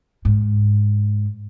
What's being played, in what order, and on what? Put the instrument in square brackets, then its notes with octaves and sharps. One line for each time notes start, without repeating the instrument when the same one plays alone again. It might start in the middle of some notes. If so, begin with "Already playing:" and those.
[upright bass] G#2